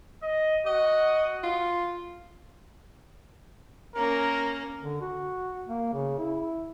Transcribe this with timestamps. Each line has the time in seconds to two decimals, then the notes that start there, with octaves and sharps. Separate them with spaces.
0.23 D#5
0.66 F#4 D#5
1.44 F4
3.96 A#3 C#4 A#4
4.81 D3
5.01 F#4
5.67 A#3
5.93 C#3
6.18 E4